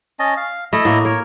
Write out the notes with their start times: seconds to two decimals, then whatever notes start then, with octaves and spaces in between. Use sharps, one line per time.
0.19 C#4 D#5 A5
0.37 F5
0.73 A3 E4 D#5
0.85 A2 A#3
1.05 A#4 C#5